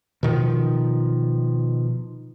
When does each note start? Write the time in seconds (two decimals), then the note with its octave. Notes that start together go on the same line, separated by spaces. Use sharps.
0.23 B2 D#3 F3